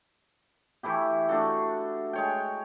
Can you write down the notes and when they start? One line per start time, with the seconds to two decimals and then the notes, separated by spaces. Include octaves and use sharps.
0.83 E3 A3 E4 G4
1.29 A3 D4 F#4 A4
2.13 G#3 C#5 G5